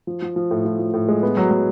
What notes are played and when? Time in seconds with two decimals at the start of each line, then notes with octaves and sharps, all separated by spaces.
0.07 F3
0.22 F3
0.36 F3
0.51 A2
0.65 F3
0.79 F3
0.94 A2
1.08 G#3
1.23 B3
1.37 F#3
1.51 F#3